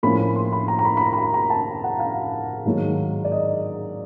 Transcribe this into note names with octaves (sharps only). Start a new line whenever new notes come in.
A2 F3 A#3 C#4 B5
B5
C6
B5
A#5
A#5
B5
B5
A#5
B5
A#5
A#5
A5
F#5
F5
G#2 D#3 F#3
D5
D#5